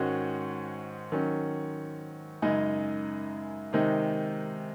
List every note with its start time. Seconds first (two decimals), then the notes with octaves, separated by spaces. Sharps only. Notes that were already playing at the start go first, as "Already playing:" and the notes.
Already playing: G#2 D#3 G#3 C#4 F#4
1.12 D#3 F#3 C#4
2.42 F#2 C#3 G#3 D#4
3.73 C3 D#3 G#3 D#4